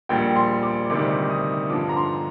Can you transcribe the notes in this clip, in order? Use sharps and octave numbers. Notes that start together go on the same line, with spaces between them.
A#1 A#2 G3 G5
C6
D6
D2 C3 D#3 G3 D6
D#6
G2 D3 F3 D6
A#5
C6